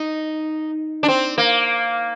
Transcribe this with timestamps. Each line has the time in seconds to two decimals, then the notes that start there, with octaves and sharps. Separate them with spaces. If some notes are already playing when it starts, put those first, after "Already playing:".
Already playing: D#4
1.03 D4
1.08 C4
1.38 A#3